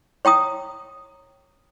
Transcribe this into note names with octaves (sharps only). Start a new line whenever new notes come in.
C#5 G5 A#5 D#6